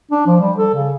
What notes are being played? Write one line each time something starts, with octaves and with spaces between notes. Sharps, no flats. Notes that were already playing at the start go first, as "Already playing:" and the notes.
D4
F3
G3
A4
C#3